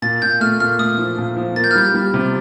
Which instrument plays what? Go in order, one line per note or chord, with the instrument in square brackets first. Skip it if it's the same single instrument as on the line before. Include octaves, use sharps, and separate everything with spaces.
[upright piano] A#2 [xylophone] A6
[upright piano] A#2 [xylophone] G6
[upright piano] A3 [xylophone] F6
[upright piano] A#2 [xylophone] F6
[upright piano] A3 [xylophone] D#6
[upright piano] F3
A#2
F3
[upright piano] A#3 [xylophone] A6
[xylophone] G6
F6
[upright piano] G3 [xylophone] G6
[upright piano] G3
C3